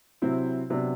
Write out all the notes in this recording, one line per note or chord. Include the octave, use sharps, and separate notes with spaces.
C3 F#3 C4 E4
C3 F#3 B3 D4